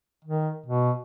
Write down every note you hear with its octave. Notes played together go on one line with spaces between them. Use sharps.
D#3
B2